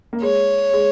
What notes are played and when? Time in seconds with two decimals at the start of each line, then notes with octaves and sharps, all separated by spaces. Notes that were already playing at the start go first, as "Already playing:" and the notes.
0.13 A#3
0.22 G#3 C#5
0.73 G#3